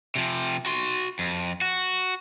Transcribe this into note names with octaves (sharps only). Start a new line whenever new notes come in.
C3 F3
F#4 C6
F2
F#4